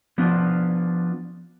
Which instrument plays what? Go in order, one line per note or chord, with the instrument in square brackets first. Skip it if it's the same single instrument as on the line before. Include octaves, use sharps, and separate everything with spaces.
[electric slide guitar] F3 B3 D4 F4